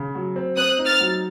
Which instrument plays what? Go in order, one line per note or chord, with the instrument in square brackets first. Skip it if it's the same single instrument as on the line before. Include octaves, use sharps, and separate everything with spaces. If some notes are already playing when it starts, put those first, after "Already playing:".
Already playing: [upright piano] C#3
F#3
C4
[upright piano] C4 [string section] D#6 F#6
[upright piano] D#4
[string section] F6 A6
[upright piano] F#3